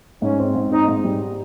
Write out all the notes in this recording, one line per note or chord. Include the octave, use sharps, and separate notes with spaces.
G#2 C#4
C4
G#2
C4 D#4
G#2
G3